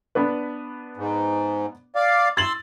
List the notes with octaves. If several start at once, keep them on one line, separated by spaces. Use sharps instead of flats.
B3 D4 B4
G#2
D5 F5
C6 E6 A6 F#7